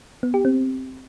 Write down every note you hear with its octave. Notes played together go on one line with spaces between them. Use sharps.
B3
G4
C4